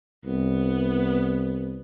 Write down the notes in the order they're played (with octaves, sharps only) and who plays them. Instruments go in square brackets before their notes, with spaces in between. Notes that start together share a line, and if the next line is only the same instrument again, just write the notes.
[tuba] C2 [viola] B3